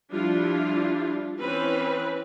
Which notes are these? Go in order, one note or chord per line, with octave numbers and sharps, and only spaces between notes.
F3 G3 D4 E4 F4
E3 C4 C#4 B4